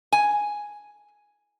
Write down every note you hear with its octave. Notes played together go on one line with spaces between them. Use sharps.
G#5